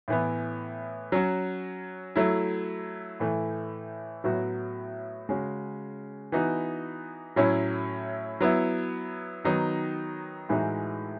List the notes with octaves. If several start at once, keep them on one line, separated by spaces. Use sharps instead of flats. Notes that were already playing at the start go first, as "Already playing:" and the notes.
A2 E3 B3
F#3 C#4 F#4
F#3 A3 E4
A2 E3 A3
A2 F#3 B3 F#4
C#3 G#3 C#4 F#4
E3 B3 D#4 F#4
A2 F#3 C#4 E4
F#3 B3 E4
D#3 F#3 B3 D#4
A2 E3 G#3 D#4 F#4